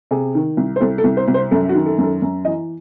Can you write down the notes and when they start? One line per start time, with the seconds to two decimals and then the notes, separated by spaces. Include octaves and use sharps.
0.11 C3 G#4
0.35 D#3
0.57 C2
0.76 C5
0.81 C2 A4
0.98 A4
1.04 C2
1.17 C5
1.28 C2
1.34 C5
1.51 F#2 A4
1.69 F#4
1.74 D#3
1.86 A4
1.99 F#2
2.04 A4
2.22 F#2
2.45 E3 D#5